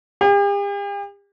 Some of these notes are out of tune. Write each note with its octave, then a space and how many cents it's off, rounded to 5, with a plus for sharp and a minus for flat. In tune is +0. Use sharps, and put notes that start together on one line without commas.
G4 +45